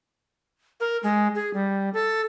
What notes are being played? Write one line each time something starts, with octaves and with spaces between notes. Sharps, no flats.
A#4
G#3
G#4
G3
A4